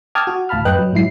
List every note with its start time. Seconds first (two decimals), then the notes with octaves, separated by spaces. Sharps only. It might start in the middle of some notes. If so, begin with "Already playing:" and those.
0.15 G5 A5 D6 D#6 F6 G#6
0.27 F#4
0.49 D2 A2 F5 A5 B5 F6
0.65 F#2 B4 D#5 G5 F#6
0.79 F#3
0.93 G#2 F#3 E4 C7